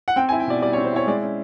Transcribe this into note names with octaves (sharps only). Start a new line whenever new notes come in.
F#5
C4 G5
G#5
E4
G5
B2 D5
G3 D5
C#5
C4
C5
E4 C#5
G#3 D5
C#4